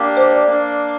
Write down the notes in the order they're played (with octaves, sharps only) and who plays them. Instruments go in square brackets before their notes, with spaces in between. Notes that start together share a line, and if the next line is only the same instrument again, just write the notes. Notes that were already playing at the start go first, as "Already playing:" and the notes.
Already playing: [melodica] A#3 D4 G4
[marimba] C5
D5
[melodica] A#3 D4